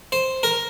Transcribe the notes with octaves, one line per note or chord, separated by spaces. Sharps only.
C5
A#4